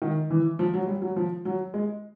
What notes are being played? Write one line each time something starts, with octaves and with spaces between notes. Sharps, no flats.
D#3
E3
F3
F#3
G3
F#3
F3
F#3
G#3